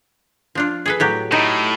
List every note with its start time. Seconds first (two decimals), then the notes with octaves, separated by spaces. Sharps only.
0.55 F3 D4 F4
0.86 G#4 A4 B4
1.00 A2 F#3 G4
1.32 A2 D#4